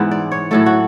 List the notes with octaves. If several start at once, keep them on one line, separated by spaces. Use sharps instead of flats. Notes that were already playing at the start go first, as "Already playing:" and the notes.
Already playing: G#2 E3 B3
D5
C#5
A2 F#3 A3 A4
F#4